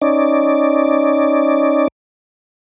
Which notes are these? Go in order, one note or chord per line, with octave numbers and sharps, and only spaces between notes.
C#4 D#4 D5